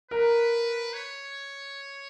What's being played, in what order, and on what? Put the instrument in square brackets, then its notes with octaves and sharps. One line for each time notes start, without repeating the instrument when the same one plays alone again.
[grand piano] A#4 [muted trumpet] B4
[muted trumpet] C#5